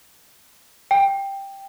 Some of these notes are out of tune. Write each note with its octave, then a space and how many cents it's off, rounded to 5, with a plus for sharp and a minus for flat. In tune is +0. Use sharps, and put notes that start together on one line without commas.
G5 +5